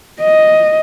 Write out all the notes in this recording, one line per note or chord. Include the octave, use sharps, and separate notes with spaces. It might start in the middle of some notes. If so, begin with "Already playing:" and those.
D#5